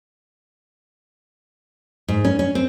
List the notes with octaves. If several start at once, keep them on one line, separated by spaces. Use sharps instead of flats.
G#2
C#4
C#4
C4